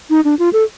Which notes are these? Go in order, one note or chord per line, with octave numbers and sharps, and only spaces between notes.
D#4
D4
F4
A4